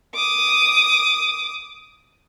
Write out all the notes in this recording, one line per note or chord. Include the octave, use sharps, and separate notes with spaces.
D6 D#6